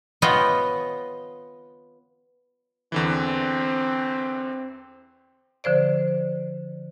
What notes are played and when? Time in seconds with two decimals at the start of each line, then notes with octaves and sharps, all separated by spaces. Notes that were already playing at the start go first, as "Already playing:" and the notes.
0.22 B3 F4 C#5 D#5 G5
2.92 E2 D3 E3 C4
5.64 D3 F3 C5 D5